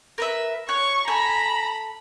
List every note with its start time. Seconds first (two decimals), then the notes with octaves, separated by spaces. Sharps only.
0.18 A#4 B4 E5
0.69 C#5 C#6 F#6
1.08 A4 G#5 A#5 B5